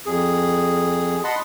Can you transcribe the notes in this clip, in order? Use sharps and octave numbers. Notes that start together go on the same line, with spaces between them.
F2 G#4
D#5 F#5 A5 B5 C6